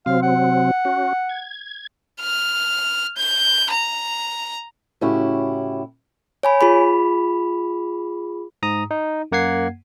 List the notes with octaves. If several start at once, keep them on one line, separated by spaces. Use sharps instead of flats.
C3 F#3 C4 F5
F#5
C#4 F#4
G#6
F6
G6
A#5
A2 C#3 C#4 E4 F#4 G4
C#5 G#5 B5
F4 G#4 B5
G#2 A#5 D#6
D#4
F#2 A#3 F#5 G#6 C7